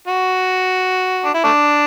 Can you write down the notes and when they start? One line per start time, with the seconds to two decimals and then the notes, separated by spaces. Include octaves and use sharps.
0.08 F#4
1.25 D4
1.34 E4
1.44 A3 D4